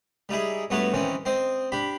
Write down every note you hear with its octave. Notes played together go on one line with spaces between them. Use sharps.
G3 D#4 E4 G#4
G2 A3 B3 F#4 C#5 A5
D#3 E3 C4 C#4
C4 C5 D#5
D4 G4 B5